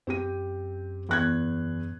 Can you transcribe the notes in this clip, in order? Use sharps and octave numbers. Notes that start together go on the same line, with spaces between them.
F#2 C4 G4 D#7
E2 F#6 G#6